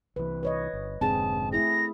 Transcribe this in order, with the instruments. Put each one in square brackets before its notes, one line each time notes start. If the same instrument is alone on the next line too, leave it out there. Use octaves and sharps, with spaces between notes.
[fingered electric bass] C2 E3 [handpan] B4
[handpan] B4 C#5 D#5
[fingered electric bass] G1
[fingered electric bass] F1 G#2 D3 [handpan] C4 G#4 [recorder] A5
[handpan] A3 E4 G#4 [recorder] A#6